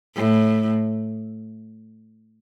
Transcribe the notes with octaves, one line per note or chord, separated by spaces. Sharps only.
A2